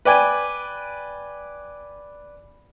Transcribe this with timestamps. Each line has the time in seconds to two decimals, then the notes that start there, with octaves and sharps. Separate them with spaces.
0.05 B4 D5 G5 G#5